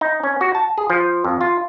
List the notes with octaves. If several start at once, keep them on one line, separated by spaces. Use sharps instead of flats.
D#4
C#4
F#4
A5
G#4
F3
F2
F4